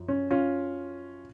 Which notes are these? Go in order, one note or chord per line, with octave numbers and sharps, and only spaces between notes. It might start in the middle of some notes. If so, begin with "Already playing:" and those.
Already playing: F#2 F3
C#4
C#4 F4